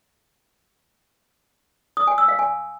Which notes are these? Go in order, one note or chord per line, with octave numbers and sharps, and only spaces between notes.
D#6
G#5
E6
F5
G#5